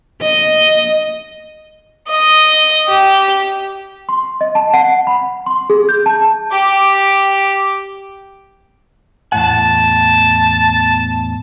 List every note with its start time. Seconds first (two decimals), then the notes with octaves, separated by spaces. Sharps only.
0.21 D#5
2.09 D#5
2.88 G4
4.09 C6
4.41 D#5
4.55 A5
4.74 F#5
5.07 B5
5.46 C6
5.70 G#4
5.89 G6
6.06 A5
6.51 G4 D6
9.32 E2 A2 F#5 A5